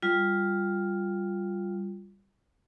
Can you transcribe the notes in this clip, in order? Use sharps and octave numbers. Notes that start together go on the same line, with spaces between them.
G3 F4